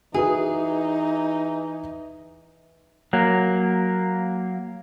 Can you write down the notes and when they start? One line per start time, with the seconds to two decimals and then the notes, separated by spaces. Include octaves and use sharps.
0.14 E3 D#4 F#4 G#4 B4 D#6
3.13 F#3 A#3